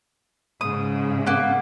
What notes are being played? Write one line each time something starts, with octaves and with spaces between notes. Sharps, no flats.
G#2 C#3 D#6
A#3 B3